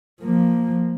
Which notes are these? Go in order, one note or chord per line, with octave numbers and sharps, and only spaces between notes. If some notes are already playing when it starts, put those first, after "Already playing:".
F3 A#3